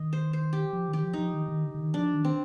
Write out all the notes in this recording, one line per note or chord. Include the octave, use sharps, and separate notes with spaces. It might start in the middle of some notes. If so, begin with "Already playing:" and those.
Already playing: D#3 D#5
C5
C5
G4
F3
D#3
G4
F3
F3 D#4
D#3
D#3
D3
D3
D#3
F3 D4
D#3
C4